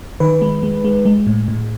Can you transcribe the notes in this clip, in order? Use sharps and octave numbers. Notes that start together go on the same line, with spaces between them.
D#3 B4
G#3
G#3
G#3
G#3
A2
A2